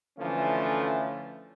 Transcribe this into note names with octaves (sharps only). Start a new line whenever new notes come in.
D3 E3 F3 A3 C#4